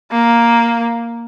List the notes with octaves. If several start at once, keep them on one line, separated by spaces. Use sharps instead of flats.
A#3